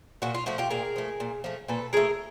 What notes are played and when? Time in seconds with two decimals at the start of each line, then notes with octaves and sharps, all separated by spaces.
0.22 A#2 F#4
0.35 F4
0.46 F3 A3 F#4
0.58 F4 G4
0.70 A#2 G#4 A#4
0.96 F3 A3
1.20 A#2
1.44 F3 A3
1.68 A#2 A4 B4
1.93 F3 A3 G#4 A#4